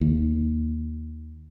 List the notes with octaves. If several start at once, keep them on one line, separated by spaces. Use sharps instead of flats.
D#2